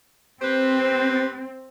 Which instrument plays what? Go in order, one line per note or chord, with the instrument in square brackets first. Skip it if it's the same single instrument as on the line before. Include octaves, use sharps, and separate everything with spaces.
[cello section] C4 [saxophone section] G4 B4 C5